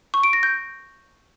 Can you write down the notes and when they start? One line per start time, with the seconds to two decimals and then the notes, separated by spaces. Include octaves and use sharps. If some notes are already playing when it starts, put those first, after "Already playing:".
0.14 C#6
0.23 D7
0.33 A#6
0.43 G6